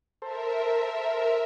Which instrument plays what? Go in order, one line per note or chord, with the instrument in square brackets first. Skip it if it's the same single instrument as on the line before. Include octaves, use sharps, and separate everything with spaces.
[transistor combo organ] A4 C5 [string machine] A#4 E5